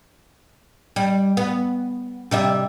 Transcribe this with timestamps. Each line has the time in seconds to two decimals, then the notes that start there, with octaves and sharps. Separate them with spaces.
0.96 G3
1.37 B3
2.31 C3 G3 E5